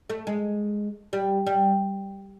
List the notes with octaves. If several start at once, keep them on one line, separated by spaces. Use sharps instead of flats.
A3
G#3
G3
G3